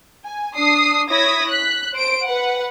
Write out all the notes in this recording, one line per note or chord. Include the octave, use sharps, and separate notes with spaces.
G#5
D4 D#6 C7
E4 C#5 D#6 G#6 A#6 B6
F#6 B6
C5 D7
B4 F#5